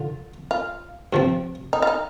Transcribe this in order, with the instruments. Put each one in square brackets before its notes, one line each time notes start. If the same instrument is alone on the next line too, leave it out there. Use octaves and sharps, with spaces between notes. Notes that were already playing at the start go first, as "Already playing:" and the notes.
Already playing: [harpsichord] D3 F4
[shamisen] F4
[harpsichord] G2 F3 C4
[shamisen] D#4
F4
D#4